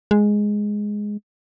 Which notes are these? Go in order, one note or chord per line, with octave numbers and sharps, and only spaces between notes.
G#3